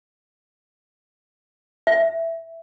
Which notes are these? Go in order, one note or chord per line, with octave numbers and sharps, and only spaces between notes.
E5